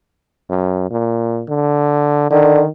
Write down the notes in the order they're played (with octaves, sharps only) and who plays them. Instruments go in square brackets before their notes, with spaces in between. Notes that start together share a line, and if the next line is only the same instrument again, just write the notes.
[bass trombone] F#2
A#2
D3
[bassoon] D3 [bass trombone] D#3